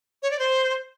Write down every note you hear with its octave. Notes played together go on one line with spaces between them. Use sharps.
C#5
D5
C5